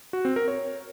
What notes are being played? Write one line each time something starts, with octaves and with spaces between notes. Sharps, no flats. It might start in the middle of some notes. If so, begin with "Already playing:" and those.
F#4
C4
A#4
C#5